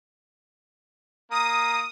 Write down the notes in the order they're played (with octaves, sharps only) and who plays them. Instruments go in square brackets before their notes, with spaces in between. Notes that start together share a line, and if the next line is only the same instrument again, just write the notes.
[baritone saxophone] A#3 [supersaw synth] D#6